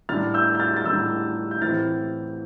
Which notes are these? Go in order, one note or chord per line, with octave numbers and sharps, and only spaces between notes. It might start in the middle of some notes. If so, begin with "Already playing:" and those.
A2 G3 D4 F6 A6
E6 G6
G6
F6 A6
A6
A2 G3 D4 E6 G6
G6
A2 E3 A3 C4 F6 A6